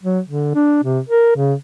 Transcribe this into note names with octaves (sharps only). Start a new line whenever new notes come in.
F#3
D3
D4
C3
A#4
C#3